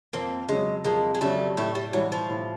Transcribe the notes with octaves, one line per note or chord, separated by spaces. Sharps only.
F2 A#3 C4
C#3 F#3 G#3
F2 G#3 A#3
G#3
C#3 F#3 G3 A3
A2 G3 A3
G3
E3 F#3 G3
F3
A2